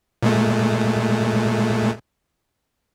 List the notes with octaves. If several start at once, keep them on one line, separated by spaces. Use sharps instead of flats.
A#2 G#3 A3